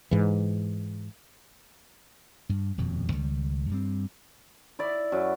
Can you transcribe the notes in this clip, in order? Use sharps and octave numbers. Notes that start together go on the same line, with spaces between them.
G#2 E3
G2
D#1 F2 B2
C#2 D#3 G3
G2 G3 C4
E4 D5
F#2